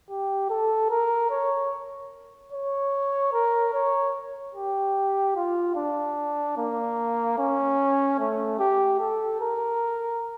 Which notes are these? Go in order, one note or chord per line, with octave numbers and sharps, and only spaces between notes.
G4
A4
A#4
C#5
C#5
A#4
C#5
G4
F4
D4
A#3
C#4
A3
G4
A4
A#4